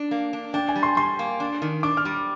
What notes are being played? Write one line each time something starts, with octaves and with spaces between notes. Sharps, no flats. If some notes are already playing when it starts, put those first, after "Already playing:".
Already playing: D4
A#3
D4
D4 G5
G#5
G3
C6
G3 C6
A#3
D4
D#3
D4 D6
F6
G3